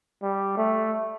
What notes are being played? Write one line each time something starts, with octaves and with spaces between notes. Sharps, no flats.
G3
A3